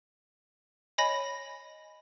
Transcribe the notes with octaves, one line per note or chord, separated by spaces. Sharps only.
C#5 D#5 G#5 B5 A#6